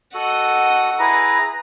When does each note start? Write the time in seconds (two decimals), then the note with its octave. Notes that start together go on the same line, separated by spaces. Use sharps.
0.14 F#4 A4 D#5 F#5
0.99 E4 G#4 B4 A#5